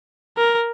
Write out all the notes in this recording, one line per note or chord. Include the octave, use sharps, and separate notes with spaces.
A#4